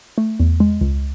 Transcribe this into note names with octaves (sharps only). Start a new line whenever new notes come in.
A3
E2
G#3
C#2